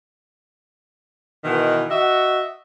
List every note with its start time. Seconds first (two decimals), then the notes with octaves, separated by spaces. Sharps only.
1.44 B2 D#3 E3
1.90 F#4 D#5 E5